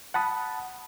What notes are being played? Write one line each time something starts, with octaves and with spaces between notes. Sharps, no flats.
F#5 A5 B5 D#6